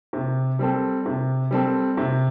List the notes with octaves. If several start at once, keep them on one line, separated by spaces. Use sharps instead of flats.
C3
G3 C4 A4
C3
G3 C4 A4
C3